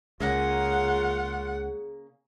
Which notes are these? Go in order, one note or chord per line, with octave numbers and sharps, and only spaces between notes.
C#2 C#3 A#3 F4 G#4 F#5